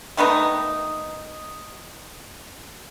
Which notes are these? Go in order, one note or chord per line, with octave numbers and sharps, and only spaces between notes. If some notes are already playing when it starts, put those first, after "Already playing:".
D#3 A3 B3 D#4